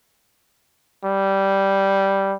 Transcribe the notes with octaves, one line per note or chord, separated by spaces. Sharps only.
G3